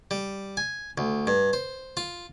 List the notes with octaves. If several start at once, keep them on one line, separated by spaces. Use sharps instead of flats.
G3
G#5
D2
G2
C5
F4